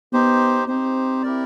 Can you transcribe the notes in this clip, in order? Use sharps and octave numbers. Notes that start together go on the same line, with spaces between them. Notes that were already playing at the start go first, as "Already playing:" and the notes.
B3 D#4 G4 C5
C4 D#4 G4 C5
E4 G4 A#4 D5